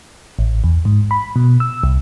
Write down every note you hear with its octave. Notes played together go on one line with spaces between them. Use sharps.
A1
E2
G#2
B5
B2
E6
C2